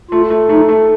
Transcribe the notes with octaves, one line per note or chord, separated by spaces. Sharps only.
A3 F4
A3
A3 D#4
A3